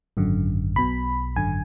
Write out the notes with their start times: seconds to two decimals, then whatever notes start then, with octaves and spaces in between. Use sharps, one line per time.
0.17 G#1 F#2 D3
0.76 B1 B2 B5
1.36 G#1 F#2 D3 G#5